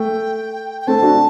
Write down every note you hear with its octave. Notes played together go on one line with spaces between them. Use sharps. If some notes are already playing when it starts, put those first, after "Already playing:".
Already playing: A3 G5
G5
A3 C4 A5
D4 F#4